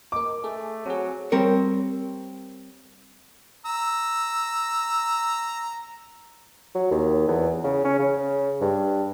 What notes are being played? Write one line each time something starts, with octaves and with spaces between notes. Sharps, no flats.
A#4 D#5 D6
A3 G#4 A4
F#3 C4 G#4
G3 C4 A#4 C#5
A#5 E6
F#3
D#2
E2
C#3
C#4
C#3
G2